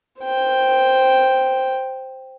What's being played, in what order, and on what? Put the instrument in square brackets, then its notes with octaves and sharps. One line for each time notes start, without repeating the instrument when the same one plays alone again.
[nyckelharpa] C5 G5